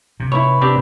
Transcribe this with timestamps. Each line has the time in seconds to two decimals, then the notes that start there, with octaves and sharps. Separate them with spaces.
0.20 C3
0.32 E4 B4 C#5
0.62 C4 D4 G4